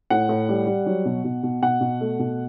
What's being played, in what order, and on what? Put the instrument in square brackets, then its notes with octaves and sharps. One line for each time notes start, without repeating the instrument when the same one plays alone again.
[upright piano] A2 F#5
A2
G3
G3
F#3
B2
B2
B2
B2 F#5
B2
A3
B2